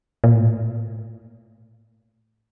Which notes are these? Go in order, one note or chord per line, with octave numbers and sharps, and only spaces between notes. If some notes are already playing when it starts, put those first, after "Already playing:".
A#2
A2